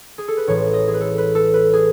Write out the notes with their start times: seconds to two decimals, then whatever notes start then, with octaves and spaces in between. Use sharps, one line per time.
0.18 G#4
0.28 A4
0.37 B4
0.47 A1 A2 E3 G#3 C#5
0.73 D#5
0.88 G#4
0.94 B4
1.01 A4
1.18 B4
1.35 A4
1.54 B4
1.73 G#4